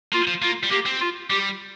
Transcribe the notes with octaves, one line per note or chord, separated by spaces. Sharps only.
A#3 F4
F3
A#3 F4
G3
A#3 G4
C4
F4
G3 G4